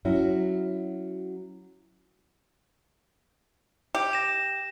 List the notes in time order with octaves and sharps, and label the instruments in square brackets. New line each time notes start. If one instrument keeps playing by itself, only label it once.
[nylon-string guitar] F#3 C#4 E4 F#4
[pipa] G4
[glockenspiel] A#6 E7